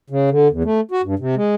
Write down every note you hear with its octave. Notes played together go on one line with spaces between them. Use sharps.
C#3
D3
E2
A3
F#4
G2
C3
G#3